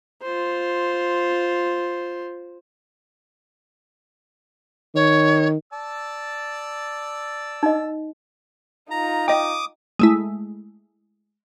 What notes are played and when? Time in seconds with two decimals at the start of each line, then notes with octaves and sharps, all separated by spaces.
0.22 F4 C5
4.95 D#3 C#5
5.73 D5 A5 E6
7.63 D#4 D#5
8.91 D#4 F4 A#5
9.28 D#5 G5 D6 D#6
9.99 G#3 A3 E4